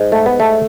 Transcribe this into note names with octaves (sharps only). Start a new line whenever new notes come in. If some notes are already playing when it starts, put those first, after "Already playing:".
Already playing: G#2 G#3
A3
B3
A3